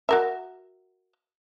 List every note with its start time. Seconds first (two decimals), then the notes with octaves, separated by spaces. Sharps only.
0.09 F#4 A#4 E5